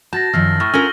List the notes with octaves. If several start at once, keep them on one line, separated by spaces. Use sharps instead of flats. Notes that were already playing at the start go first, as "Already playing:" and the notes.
F#4 A5 G6 A6 A#6
F#2 D#3 F3 E6 F6 C7
A2 C#6 F6 A6
C#4 F4 A4 A#4 F#5 A#6 F#7 G7